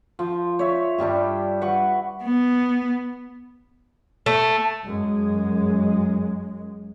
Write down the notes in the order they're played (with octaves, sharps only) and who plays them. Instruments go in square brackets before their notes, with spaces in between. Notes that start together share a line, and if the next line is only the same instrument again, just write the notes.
[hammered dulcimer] F3
C#5 E5
G2 G3 D4 G5
B4 F#5 C#6 D6
[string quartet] B3
[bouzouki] A3
[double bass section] F#2 G#3